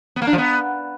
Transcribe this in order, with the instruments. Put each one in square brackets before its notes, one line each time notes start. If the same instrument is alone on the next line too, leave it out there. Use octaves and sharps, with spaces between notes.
[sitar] B3
A#3
D4
F3
B3